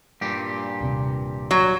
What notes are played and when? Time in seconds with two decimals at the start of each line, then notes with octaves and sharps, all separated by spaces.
0.21 G2 A#2 G4
0.81 D#1 C3
1.51 F#3